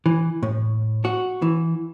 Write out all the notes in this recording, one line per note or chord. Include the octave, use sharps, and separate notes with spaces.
E3
A2
F#4
E3